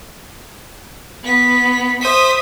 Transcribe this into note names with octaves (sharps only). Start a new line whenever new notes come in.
B3 B6
C5 E5 D#6 B6